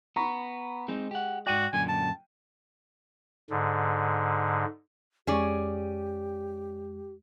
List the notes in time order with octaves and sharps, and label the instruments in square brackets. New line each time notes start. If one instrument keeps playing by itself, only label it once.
[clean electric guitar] B3 [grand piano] A#5 B5 C#6
[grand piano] G#3 [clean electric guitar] C4 D#4
[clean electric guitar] G4 F#5
[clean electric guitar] G#2 D5 [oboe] F#4 [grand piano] G5 D#7
[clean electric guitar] F#2 A#2 D3 [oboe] G#5
[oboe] A5
[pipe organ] G#2 D3
[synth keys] F2 G#3 [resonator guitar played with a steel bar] C#4 G#4 D5 [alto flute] G4